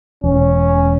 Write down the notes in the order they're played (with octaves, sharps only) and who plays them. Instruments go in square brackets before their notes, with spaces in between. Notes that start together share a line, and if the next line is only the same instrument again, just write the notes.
[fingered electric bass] E1 [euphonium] C#4